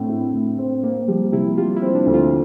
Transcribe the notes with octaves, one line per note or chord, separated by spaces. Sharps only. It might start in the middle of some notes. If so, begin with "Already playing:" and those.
Already playing: A2 C4 D4
E4
A2
C4
A#3 C4
F3 G3
C3 E4
G3 F4
E4
C4
D4
D2
F4